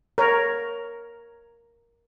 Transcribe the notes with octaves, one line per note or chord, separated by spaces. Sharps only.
A#4 C#5